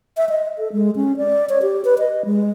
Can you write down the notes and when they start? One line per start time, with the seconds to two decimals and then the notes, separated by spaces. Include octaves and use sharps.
0.17 E5
0.29 D#5
0.59 A4
0.72 G#3
0.96 C#4
1.17 D5
1.49 C#5
1.62 G4
1.85 B4
1.99 D#5
2.25 G#3